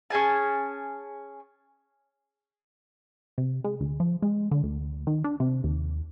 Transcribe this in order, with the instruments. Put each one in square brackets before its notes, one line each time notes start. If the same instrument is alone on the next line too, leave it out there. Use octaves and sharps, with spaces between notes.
[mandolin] C#4 G#4 G#5 A5
[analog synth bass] C3
G#3
D2
F3
G#3
D3
D2
D#3
D4
C3
D#2